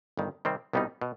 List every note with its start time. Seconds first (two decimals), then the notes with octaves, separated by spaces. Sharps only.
0.17 G1 G2 D#3
0.45 C3 D#3 G3 C4
0.73 C2 B2 G3 B3 D#4
1.01 B2